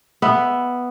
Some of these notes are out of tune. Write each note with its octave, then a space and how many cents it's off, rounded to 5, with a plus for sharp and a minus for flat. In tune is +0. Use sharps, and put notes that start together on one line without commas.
B3 +0 E5 +0